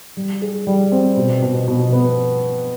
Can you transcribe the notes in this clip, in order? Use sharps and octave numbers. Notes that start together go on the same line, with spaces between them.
G3
G#4
G3
C4
B2
B2
B2
B3